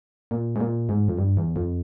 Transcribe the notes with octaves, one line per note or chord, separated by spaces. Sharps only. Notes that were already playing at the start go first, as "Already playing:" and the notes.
A#2
G#2
A#2
G#2
F2
G2
E2
F2